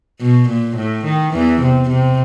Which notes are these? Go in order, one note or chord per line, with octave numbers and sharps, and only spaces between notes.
B2
A#2
A2
D#3
E2 E3
C3
C3